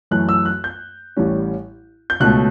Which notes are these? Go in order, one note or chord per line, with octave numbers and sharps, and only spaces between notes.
F#2 E3 A3 F#6
E6
F#6
G6
A1 A2 G3 C#4
G6
C#2 B2 A3 C#4 F#6